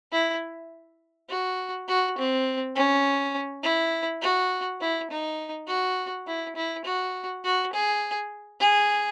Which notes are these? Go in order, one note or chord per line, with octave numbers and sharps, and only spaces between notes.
E4
F#4
F#4
C4
C#4
E4
F#4
E4
D#4
F#4
E4
E4
F#4
F#4
G#4
G#4